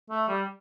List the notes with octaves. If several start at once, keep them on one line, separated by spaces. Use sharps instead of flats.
A3
G3